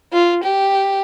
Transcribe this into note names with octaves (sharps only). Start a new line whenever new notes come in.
F4
G4